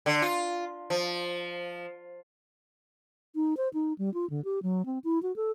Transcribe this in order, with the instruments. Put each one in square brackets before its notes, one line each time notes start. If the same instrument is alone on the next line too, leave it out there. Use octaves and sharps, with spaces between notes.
[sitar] D3
F4
F3
[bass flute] D#4
C5
D#4
G3
F4
D3
G4
F#3
C4
E4
F#4
A4